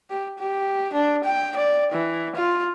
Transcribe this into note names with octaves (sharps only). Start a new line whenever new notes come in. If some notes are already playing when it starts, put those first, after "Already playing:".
G4
G4
D4
G5
D5
E3
F4